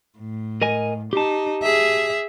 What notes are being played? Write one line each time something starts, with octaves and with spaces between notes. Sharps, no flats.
A2
A#4 D#5 G#5
D#4 G4 A5
G#4 E5